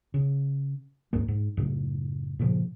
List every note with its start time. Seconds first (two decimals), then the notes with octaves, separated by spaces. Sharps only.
0.14 C#3
1.13 D#2 G#2 A#3
1.28 G#2
1.57 F#2 A2 C#3
2.39 G2 A#2 C#3 F3